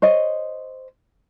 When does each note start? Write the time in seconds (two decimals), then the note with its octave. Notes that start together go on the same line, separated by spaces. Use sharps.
0.02 C5 C#5 D#5